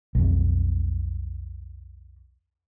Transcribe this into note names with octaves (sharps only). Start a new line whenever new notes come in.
B1 F2